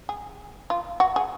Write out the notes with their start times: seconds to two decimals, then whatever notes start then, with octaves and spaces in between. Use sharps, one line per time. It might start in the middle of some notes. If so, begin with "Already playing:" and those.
0.09 G#4
0.70 F4
1.00 F#4
1.16 G#4